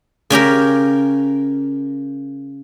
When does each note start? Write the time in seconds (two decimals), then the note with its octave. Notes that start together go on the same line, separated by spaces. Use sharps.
0.30 C#3 C#4 G4 A#4